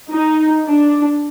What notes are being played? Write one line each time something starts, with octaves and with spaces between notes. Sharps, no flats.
D#4
D4